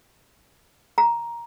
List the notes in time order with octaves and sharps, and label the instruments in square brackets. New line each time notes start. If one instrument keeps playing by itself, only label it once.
[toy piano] A#5